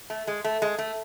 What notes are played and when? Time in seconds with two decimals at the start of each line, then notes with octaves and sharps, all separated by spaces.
0.10 A3
0.27 G#3
0.44 A3
0.62 G#3
0.78 A3